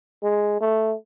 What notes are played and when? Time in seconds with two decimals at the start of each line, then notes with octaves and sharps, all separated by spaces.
0.23 G#3
0.61 A3